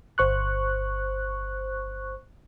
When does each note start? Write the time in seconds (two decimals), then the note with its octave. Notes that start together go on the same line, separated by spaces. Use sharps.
0.18 G1 C5 C#6 F#6